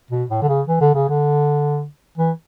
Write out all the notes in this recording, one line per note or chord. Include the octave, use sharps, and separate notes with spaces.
B2
A2
D3
C#3
E3
D3
C#3
D3
E3